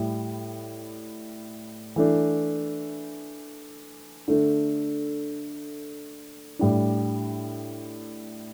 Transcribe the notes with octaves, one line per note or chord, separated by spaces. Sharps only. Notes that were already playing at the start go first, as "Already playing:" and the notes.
Already playing: A2 G3 E4
E3 A3 D4
D3 A3 D4
A2 G3 D4